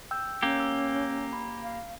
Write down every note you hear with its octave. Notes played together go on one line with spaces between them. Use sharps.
G5 E6 G6
A#3 C#4 G4
E6
B5
F5